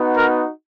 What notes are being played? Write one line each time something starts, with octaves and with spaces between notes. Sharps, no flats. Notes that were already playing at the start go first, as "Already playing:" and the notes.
Already playing: B3 D#4 F#4
A#4